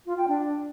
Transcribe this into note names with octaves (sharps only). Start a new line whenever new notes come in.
F4
G5
D4